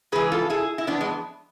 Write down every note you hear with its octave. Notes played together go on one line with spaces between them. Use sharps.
G#2 E3 G#4 B4
F4 A4
E4 G#4
E4
F2 E3 B3 D4
G#3